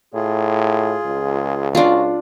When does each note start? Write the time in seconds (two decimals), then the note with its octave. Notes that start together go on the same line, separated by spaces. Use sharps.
0.14 A2 F4 G#4
1.06 C#2
1.75 D4 F4 F#4